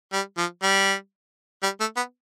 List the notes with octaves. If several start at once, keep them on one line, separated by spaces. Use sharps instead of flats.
G3
F3
G3
G3
A3
B3